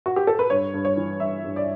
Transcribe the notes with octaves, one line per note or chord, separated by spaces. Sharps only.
F#4
G4
A4
B4
G2 C#5
G2
C#5
E3
G2 E5
G2
D5